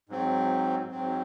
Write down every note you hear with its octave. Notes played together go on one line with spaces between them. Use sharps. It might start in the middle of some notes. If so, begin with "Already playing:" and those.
G#2 F#3 C4
G#2 F#3 C4